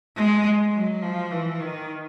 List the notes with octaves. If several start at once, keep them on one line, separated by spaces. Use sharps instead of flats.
G#3
F#3
F3
E3
D#3